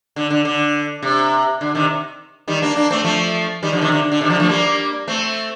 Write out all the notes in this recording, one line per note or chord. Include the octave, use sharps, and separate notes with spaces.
D3
D3
D3
C3
D3
C3 D#3
D#3 G3
A#3 D4
A#3 D4
A3 C4
F3 A3
D#3 G3
D3 F3
C3 D#3
D3
D3
C3 D#3
D3 F3
F3 A3
G3 A#3
A3 C4